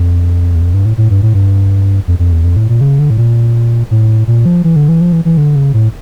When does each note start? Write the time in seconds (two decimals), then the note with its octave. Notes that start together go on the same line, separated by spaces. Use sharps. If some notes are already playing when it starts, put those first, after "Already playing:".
Already playing: F2
0.55 E2
0.61 F2
0.74 G2
0.86 A2
0.97 A2
1.10 G2
1.22 A2
1.34 G2
2.08 F2
2.19 F2
2.32 E2
2.44 F2
2.57 A2
2.69 A#2
2.81 C#3
2.99 D3
3.10 A2
3.17 A#2
3.91 A2
4.27 A#2
4.46 F3
4.64 E3
4.76 D3
4.89 E3
5.01 F3
5.12 E3
5.25 E3
5.37 D3
5.56 C#3
5.74 A2